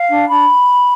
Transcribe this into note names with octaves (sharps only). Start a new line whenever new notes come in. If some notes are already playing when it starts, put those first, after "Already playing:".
Already playing: F5
D4
D4 B5